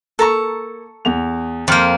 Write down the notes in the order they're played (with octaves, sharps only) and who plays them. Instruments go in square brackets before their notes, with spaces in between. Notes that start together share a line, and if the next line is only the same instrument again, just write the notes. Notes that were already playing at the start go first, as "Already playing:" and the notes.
[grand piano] A#3 [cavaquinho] A4 A#5 C#6
[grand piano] E2 F7
[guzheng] F2 A#3 [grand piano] C6 F6 G6